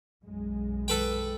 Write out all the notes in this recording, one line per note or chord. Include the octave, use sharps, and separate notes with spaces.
B1 F#2 G#3
A4 B4 G5